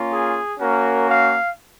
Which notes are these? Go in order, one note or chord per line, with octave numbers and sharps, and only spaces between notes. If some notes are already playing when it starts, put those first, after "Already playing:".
Already playing: A#3 C#4 F4
G#4
A#3 C#4 F#4 A#4
F5